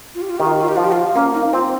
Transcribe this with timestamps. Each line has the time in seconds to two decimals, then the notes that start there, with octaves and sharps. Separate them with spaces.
0.15 F4
0.22 G4
0.30 F4
0.38 D#3 G4
0.46 F4
0.53 G4
0.61 F4
0.68 G4
0.76 F3 F4
0.84 G4
0.92 F4
1.15 A#3 C#4
1.34 D#4
1.53 C4 F4